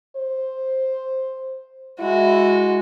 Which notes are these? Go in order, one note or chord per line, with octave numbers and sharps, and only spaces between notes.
C5
G#3 E4 F#4